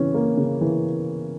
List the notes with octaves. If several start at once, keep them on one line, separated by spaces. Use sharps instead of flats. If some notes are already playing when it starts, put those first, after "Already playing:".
Already playing: C#3 E3 C#4
A#3
C#3
E3